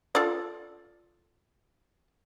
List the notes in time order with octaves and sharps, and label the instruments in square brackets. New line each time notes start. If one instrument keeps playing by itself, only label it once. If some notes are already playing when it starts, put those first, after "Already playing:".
[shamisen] F4 A4 D5